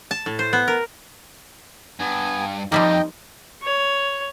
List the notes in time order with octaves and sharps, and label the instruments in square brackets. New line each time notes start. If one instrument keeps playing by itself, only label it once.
[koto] A5
A2
C5
B3
A#4
[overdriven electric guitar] G2 [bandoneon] B3 G#5
[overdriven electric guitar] F2 [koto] F3 G3 A#3 [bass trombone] D#4 [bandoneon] D#5 G5
[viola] C#5